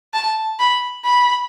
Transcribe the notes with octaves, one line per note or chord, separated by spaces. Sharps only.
A5
B5
B5